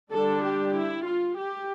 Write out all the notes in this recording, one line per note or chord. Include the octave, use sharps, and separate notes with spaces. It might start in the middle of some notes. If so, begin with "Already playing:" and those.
D3 G3 D4 A4
G4
E4
F4
G4